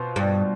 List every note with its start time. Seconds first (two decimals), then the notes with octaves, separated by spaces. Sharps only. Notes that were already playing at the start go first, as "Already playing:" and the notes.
Already playing: B2 B3 F4 C5
0.16 G2